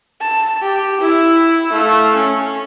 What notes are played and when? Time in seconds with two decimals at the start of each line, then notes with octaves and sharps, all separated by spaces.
0.21 A5
0.62 G4
1.01 E4
1.72 A3 F5
2.15 C#4